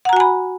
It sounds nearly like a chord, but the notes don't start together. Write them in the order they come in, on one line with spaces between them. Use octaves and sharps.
F#5 A#5 F#4 G#5 B5